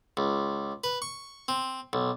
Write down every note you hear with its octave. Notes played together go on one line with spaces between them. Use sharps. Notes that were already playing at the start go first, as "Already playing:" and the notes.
C#2
B4
C#6
C4
B1